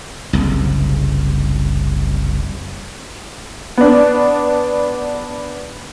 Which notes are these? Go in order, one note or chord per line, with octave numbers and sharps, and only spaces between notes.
F#1 C2
B3 D4